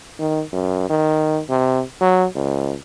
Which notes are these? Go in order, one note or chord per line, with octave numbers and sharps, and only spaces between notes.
D#3
F#2
D#3
C3
F#3
C#2